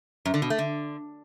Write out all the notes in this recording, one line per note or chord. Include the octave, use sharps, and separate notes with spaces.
F#2
D3
B2
A3
D3